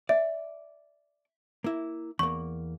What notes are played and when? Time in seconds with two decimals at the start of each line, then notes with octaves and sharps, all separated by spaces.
0.09 D5 E5
1.64 A#3 E4
2.19 E2 A#3 C#6